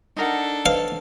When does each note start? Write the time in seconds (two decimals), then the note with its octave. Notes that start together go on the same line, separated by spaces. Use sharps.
0.16 D4 D#4 A4 A#4 F#5
0.66 B4 C5 D#5 F5